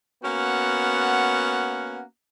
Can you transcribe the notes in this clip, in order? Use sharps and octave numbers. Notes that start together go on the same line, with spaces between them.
A#3 B3 C#4 F#4 F#5